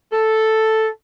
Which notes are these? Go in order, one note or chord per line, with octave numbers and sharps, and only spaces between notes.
A4